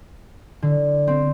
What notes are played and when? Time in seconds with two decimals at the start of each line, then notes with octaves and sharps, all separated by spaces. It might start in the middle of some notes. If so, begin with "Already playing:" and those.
0.62 D3
1.07 C4